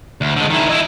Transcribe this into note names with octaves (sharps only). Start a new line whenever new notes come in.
D2
D3 G#3
D#3 E4
E4 D#5